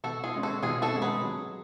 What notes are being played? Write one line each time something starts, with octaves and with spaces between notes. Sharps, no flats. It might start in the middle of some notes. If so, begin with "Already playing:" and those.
B2 F#4 A4
F4 G#4
G#3 C#4
F#4 A4
B2 F4 G#4
F#4 A4
G#3 C#4
G#4 B4
F#3